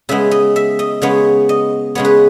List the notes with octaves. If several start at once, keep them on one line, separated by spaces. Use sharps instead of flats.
C#3 G#3 B3 E5
D#5
E5
D#5
C#3 G#3 B3 C#5
D#5
C#3 G#3 B3 C#5
B4